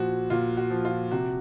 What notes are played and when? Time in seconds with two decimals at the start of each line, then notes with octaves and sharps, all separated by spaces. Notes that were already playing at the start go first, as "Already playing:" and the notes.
Already playing: A#2 F3 F#4
0.30 A#2 F4
0.57 F#4
0.70 F3
0.85 F4
1.11 C3 F#4